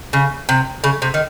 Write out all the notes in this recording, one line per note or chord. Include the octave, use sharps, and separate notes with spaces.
C#3
C3
C#3
C3
D#3